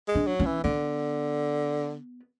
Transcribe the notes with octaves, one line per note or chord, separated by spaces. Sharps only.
G#3
D4
F#3
C#4
E3
D3 B3